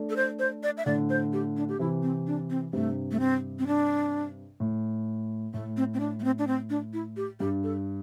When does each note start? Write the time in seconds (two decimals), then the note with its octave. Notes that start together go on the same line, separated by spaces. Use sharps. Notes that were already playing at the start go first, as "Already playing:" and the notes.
Already playing: A3 D4
0.10 A4
0.16 C5
0.39 C5
0.63 D5
0.78 E5
0.86 A2 D3 D5
1.10 C5
1.33 G4
1.57 D4
1.69 G4
1.79 C3 E3 E4
2.03 C4
2.27 D4
2.50 C4
2.73 G2 C3 A3
3.11 A3
3.20 C4
3.59 C4
3.67 D4
4.60 A2
5.54 A2 A3
5.77 C4
5.94 C4
6.00 D4
6.20 A3
6.24 C4
6.39 D4
6.47 C4
6.70 D4
6.93 E4
7.17 G4
7.40 G2 G4
7.63 A4